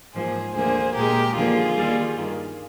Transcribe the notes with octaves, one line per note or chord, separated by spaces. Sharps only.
G#2 F3 A#3 G#4 C5
D2 D3 F3 A#3 G#4 C5
A#2 G#3 G4 A#4
D#2 D3 F3 A#3 F4 G#4
D#2 D#3 G3
G2 D#3 A#3